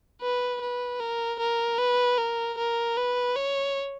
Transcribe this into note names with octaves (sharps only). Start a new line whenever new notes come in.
B4
B4
A#4
A#4
B4
A#4
A#4
B4
C#5